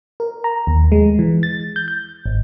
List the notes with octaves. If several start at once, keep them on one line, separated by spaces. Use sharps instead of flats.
A#4
A#5
D#2
G#3
E3
A6
G6
G6
G#1